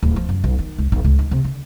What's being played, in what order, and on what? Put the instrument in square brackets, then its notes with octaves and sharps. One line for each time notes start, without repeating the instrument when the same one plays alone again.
[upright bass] D1
F3
F#2
B1
D#3
C#2
A#1
C#2
D#3
C3
D3